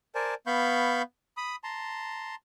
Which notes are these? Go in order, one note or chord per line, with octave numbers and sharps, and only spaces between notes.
A#4 C5 D5 G#5 A5
B3 F5 B5 C#6 G6
B5 D#6
A5 A#5 C6